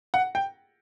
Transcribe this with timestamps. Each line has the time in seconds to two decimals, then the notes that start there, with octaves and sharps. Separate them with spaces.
0.14 F#5
0.35 G5